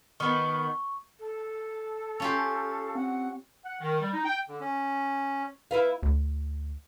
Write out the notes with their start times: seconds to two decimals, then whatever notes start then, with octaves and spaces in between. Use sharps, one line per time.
0.20 D#3 B3 C#6
1.20 A4
2.20 C#4 F4 G4 F5
2.95 C4 F#5
3.65 F#5
3.81 D#3
4.01 G3
4.13 D#4
4.25 G5
4.49 D3
4.61 C#4
5.71 E4 B4 F5
6.03 D2